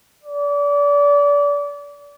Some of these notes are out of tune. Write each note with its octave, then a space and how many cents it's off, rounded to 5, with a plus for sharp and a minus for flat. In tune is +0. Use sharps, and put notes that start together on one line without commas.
D5 -30